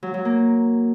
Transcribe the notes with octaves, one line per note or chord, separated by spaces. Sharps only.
F#3
F#3
A#3